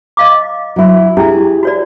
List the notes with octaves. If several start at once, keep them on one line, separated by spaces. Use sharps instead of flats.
D#5 F5 D6
F#3 E4
D4 E4 G4 G#4 E5
F#4 C#5 D5